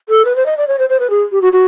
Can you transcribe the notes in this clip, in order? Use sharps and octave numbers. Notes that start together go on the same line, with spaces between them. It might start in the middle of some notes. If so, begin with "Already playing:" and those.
A4
B4
C5
D#5
D5
C#5
C5
C5
B4
G#4
G4
F#4
F#4